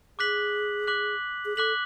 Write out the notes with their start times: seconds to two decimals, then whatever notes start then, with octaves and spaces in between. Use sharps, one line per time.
0.18 G#4 D6 F#6 B6 F#7
0.87 D6 F#6 B6 F#7
1.45 G#4
1.57 A4 D6 F#6 B6 F#7